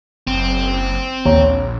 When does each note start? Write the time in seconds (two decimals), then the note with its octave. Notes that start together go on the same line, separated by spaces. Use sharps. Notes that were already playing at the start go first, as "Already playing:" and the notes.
0.27 F#1 C4
1.25 A#1 D#2 C#5 A#5